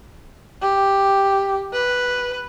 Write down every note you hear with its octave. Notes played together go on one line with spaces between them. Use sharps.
G4
B4